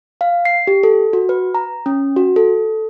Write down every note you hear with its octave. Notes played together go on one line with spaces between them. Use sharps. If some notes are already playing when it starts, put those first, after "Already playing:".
F5
C7
G4
A4
F#4
B4
A#5
C#4
F#4
A4